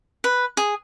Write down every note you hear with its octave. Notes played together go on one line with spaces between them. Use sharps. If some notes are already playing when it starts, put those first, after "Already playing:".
B4
G#4